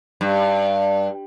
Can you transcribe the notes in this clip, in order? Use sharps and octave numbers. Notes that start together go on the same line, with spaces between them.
G2